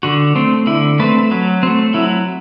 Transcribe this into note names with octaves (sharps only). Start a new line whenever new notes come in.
D3 F#4
A3 C4
D3 E4
A3 C4 B4
F#3
A3 C4
F#3 E4